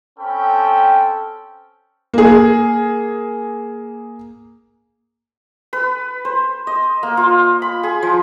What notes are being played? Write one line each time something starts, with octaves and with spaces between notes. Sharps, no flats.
C4 C#4 A4 G5 B5
A#3 G#4
B4
C5
D#5
A#3
F4
B5
G#4
F3